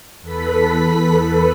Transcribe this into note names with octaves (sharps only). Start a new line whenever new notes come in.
E2 A4 B4 B5 B6